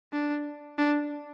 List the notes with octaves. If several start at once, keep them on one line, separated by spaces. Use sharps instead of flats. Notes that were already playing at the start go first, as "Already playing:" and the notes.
D4
D4